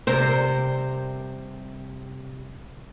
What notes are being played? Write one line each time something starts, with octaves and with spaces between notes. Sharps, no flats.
C3 G3 A#4 C5